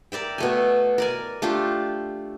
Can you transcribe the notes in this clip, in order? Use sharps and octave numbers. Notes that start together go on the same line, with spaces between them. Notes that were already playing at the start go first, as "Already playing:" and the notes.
A#4 D5 E5 G5
B2 A3 G#5
A#4 D5 G#5
A3 D4 F4 G4